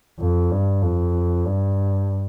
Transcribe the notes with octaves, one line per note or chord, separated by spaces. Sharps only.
F2
G2
F2
G2